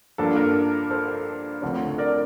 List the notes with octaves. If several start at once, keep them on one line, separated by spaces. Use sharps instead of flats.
G2 F3 A#3 D4 A4
A#4
A4 C5
D2 D3 F3 A3 C4
A#4 D5